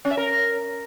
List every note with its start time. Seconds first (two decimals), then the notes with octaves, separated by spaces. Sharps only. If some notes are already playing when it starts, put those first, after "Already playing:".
0.05 C#4
0.11 E5
0.17 A#4